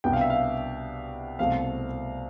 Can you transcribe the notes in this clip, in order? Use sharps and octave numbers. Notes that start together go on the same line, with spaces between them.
C2 B2 B3 D4 G5
F5
E5
F5
C2 B2 A3 C4 F5